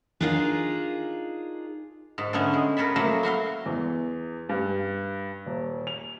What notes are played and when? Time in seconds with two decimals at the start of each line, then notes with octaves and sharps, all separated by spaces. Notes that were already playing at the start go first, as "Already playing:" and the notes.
0.21 D4 D#4 F4 G#4 A#4 F5
2.18 G#2
2.33 D3 A3 B3 C#4
2.53 G#3
2.77 A#4 B4 C#5 A5 B5
2.96 F3 F#3 A3 A#3
3.23 E4 F#4 F5 C6
3.66 E2
4.49 G2
5.46 D#1
5.87 F7